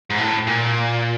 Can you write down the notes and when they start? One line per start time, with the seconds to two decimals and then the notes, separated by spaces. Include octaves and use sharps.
0.10 G#2
0.18 A2
0.47 A#2